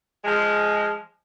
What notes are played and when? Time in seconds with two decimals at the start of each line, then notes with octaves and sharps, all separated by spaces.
0.24 F3 G#3